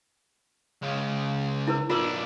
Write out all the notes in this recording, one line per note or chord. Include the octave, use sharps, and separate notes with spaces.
C#2 C#3
E4 A#4 B4
B1 D4 F4 A#4 B4